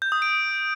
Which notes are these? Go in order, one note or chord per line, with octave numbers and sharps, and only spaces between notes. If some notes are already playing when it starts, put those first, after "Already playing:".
G6
D#6
D7